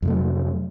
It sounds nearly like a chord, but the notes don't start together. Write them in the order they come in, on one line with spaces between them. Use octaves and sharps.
F2 C3 A3 F#3